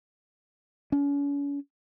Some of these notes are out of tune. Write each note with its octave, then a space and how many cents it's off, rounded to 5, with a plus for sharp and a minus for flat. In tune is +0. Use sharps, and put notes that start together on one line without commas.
C#4 +40